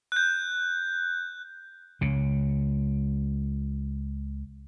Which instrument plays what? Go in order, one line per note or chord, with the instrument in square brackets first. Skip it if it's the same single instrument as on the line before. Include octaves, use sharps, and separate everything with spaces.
[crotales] F#6 G6
[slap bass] C#2 C#3